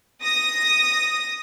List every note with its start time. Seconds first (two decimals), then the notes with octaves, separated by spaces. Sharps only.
0.23 D#6 A#6